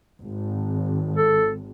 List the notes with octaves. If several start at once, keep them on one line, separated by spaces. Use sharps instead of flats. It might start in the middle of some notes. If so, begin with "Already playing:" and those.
G#1
A4